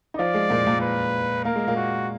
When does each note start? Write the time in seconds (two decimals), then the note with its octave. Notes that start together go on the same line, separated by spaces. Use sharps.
0.14 D#4
0.19 F3 F4 D5
0.34 G#3
0.50 A#2 A#3
0.66 A#2 A#3
0.81 B4
1.45 A#3 A#4
1.56 G#3
1.67 A#2 A#3
1.76 F#4